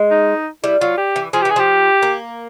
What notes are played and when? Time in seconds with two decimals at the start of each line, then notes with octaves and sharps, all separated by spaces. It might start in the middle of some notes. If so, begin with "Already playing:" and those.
Already playing: G#3
0.11 D#4
0.63 G3 E4
0.81 F#3 F4
0.98 G4
1.16 E3
1.33 F3 G#4
1.42 G4
1.45 E3
1.50 G#4
1.56 F3 G4
2.02 A#3